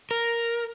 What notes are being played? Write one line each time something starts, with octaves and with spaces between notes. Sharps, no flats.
A#4